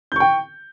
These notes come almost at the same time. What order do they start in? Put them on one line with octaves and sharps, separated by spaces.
G6 C#6 G5